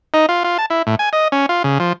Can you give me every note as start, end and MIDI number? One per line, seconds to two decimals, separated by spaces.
0.14 0.26 63
0.29 0.43 65
0.44 0.58 65
0.58 0.66 81
0.70 0.82 64
0.87 0.95 45
0.99 1.09 80
1.13 1.28 75
1.32 1.46 61
1.49 1.63 65
1.64 1.78 49
1.80 1.93 53